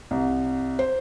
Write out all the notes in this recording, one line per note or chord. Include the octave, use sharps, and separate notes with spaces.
C2
C5